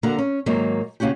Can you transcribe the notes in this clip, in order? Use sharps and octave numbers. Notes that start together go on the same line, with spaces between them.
D3 A#3 F#4 A#4 A#5
C#4
G#2 D#3 F#3 A#3
C#3 A#3 C#4 F#4 G4